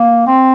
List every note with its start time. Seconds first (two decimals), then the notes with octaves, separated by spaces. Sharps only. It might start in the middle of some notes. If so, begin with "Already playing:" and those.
Already playing: A#3
0.27 C4